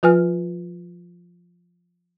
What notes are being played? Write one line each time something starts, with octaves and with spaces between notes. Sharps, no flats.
F3 F4 B4 G#5 F6